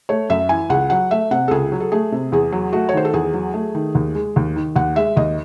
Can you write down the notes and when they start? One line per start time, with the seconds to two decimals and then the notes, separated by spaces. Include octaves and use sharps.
0.09 A3 C#5
0.30 F#2 E5
0.49 E3 G#5
0.70 C#2 F#5
0.90 F#3 F#5
1.11 A3 E5
1.31 C3 F#5
1.48 A4
1.51 C#2 G#4
1.72 F#3
1.80 A4
1.92 A3 G#4
2.12 C3
2.32 E2 G#4
2.52 F#3
2.73 A3 F#4
2.89 C#5
2.93 D#3 C5
3.05 A4
3.13 E2 G#4
3.33 F#3
3.54 A3
3.75 D#3
3.95 D#2
4.15 G#3
4.36 D#2
4.56 D#3
4.76 D#2 F#5
4.96 G#3 E5
5.16 D#2 D#5